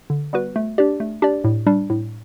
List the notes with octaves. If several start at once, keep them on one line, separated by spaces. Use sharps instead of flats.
D3
G3 B3 F#4 B4
A3
D4 G4 D5
A3
D4 G4 D5
A2
G3 D4
A2